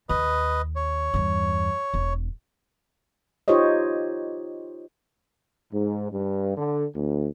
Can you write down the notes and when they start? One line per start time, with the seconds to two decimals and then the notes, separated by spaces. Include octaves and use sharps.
0.09 D#2 B4 D#5
0.76 C#5
1.14 E2 G2
1.94 E1
3.48 D#4 F4 G4 C5 C#5 D#5
5.71 G#2
6.12 G2
6.56 D3
6.95 D2